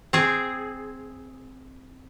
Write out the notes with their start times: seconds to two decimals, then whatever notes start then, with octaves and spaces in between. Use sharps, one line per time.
0.13 C4 G#4